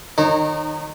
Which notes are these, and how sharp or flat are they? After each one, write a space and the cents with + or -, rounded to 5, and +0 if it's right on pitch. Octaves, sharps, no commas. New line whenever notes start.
D#3 -10 D#4 -35 C#5 -30